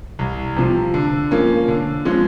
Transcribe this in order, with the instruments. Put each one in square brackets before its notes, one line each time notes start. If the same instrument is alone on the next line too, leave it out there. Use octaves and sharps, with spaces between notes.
[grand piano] C2
C3 F3
D3
F3 A#3 C#4
D3
F3 G#3 C#4